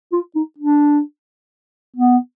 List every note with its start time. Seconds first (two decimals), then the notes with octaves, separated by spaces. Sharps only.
0.13 F4
0.35 D#4
0.58 D4
1.96 B3